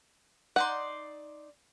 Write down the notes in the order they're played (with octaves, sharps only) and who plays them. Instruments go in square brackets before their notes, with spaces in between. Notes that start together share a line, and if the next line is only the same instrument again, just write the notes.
[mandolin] D#4 D5 C6 [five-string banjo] F#5